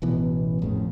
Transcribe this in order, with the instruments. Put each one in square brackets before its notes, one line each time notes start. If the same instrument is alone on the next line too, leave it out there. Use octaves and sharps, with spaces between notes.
[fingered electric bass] A1 B2 E3 B3
G#1 F2 A2 C#3